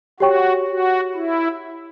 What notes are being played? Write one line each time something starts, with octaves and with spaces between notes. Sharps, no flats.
F#4 G4 C#5 G5 C#6
F#4
E4